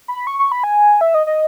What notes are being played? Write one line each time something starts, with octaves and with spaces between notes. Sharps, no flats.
B5
C#6
C#6
B5
G#5
E5
D#5
D#5